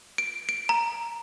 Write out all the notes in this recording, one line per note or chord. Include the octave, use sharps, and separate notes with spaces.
D7
D7
A#5